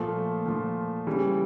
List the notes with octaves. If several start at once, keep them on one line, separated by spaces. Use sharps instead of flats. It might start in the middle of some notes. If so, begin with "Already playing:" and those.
Already playing: A#2 F3 A3
A#2 F3
C#3 E3 G3